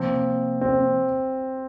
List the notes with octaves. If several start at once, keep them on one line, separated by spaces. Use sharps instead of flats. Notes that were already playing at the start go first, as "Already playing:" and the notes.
Already playing: C3 F3 A#3 C4
C4